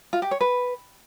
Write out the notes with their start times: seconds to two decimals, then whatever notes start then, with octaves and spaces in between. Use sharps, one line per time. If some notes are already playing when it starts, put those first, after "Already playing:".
0.13 F4
0.22 G4
0.31 C#5
0.41 B4